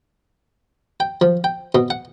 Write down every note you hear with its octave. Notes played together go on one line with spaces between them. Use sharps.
G5
F3
G5
B2
F#5